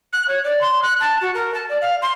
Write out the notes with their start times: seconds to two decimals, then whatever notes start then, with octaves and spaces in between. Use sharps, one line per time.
0.13 F#6
0.28 C#5
0.44 D5
0.61 C6
0.82 F#6
1.00 A5
1.21 F#4
1.34 A#4
1.54 A5
1.69 D5
1.81 F5
2.02 C6